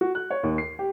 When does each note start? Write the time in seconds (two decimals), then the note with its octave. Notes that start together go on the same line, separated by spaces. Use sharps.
0.01 F#4
0.15 F#6
0.31 C#5
0.43 D#2
0.58 C7
0.79 G4